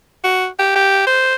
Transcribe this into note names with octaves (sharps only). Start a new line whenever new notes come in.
F#4
G4
G4
C5